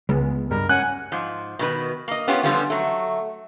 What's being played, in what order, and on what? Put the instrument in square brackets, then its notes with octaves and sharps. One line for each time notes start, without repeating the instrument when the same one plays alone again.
[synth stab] C#2 [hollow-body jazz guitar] G#3 B3
[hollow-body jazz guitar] G2 G3 G#3 [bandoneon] A#4
[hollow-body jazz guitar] C#4 [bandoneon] F#5 G#5 [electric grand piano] F#6
[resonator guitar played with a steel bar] G#2 F3
B2 D#3 B4
A#3 D#5
B3 C#4 F4 G4 C#5
D3 F3 G3 B3 C#4 F4
F#3 A3